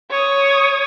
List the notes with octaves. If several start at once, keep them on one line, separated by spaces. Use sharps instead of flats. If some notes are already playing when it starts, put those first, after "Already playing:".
C#5 D#6